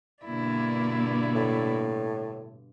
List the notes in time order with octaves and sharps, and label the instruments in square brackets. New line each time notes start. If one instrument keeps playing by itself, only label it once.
[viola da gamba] G2 B2 D3 [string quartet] A#3 E4 D5
[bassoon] A2